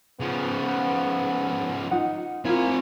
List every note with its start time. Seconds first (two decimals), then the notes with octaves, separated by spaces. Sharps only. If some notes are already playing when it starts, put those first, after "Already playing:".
0.20 C#3 F3 B3
1.91 D#4 F4 F#5
2.45 A#3 C4 E4 F4 G#5